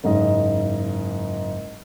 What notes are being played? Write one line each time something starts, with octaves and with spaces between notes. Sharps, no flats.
F#1 G#2 D#5